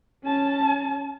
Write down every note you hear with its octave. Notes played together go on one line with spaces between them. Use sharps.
C#4 A5